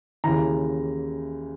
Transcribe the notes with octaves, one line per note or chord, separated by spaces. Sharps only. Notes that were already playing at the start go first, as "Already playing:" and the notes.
D#2 C#3 E3 A#5